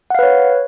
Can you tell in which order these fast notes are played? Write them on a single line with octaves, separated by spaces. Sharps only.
F#5 F5 B4 C#5